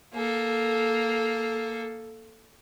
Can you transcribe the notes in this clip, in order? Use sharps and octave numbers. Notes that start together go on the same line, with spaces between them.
A#3 A4